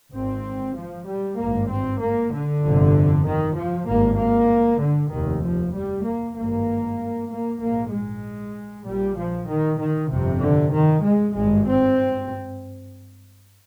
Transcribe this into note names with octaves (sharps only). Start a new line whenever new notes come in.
G#1 G#2 C4
F3
G3
G#1 G2 A#3
C4
A#3
D3
G1 F2 C3
D#3
F3
G#1 G2 A#3
A#3
D3
F1 D#2 D#3
F3
G3
A#3
G#1 G2 A#3
A#3
A#1 G#2 A#3
G#3
A#1 A#2 G3
F3
D#3
D#3
G1 F2 C3
D3
D#3
G#3
G#1 G2 G#3
C4